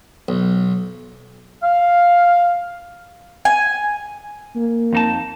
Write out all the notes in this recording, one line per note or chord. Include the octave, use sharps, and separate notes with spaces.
B1
F5
G#5
A#3
F2 D#4 A5